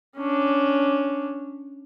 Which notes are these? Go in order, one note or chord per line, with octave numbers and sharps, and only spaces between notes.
C#4 D4